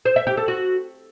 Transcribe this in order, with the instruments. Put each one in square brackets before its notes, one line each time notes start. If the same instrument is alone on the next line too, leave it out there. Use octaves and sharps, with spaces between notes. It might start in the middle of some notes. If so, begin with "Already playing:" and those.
[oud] C5
E5
G4
A4
F#4